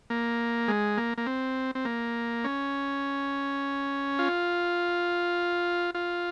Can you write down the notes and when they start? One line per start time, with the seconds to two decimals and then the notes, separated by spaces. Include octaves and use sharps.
0.10 A#3
0.68 G#3
0.97 A#3
1.18 A#3
1.27 C4
1.75 C4
1.85 A#3
2.44 C#4
4.19 F4
5.95 F4